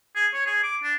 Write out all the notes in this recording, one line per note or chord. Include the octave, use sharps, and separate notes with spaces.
G#4
C#5
G#4
D6
D4